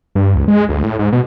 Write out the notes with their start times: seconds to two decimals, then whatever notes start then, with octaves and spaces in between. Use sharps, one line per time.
0.15 G2
0.35 C#2
0.48 G#3
0.69 D2
0.84 A2
0.99 G#2
1.12 B2